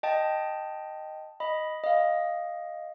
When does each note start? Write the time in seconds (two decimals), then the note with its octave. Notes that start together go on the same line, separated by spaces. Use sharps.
0.03 D#5 G5 A5
1.40 D#5 B5
1.84 D#5 F5